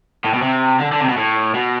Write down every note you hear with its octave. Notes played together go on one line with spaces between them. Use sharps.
A2
B2
C3
D3
D3
C3
B2
A2
B2